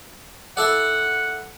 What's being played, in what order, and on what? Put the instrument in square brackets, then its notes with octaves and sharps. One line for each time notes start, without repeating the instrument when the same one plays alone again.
[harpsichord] E4 A4 D5 [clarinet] F#5